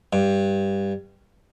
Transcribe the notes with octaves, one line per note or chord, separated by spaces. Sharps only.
G2